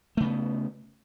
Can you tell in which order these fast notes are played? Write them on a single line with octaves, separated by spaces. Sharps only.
A3 C#3 B3